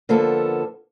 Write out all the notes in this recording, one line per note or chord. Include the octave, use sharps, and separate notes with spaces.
D3 F3 A#3 B3 A4